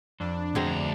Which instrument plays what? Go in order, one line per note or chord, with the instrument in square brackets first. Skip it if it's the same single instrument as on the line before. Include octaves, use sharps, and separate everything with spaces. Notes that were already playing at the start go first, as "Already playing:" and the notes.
[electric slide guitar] F2 [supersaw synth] D4
[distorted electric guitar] D2 A#5 [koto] B2 C4 G#4